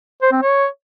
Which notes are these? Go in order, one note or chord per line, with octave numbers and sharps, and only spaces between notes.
C5
C4
C#5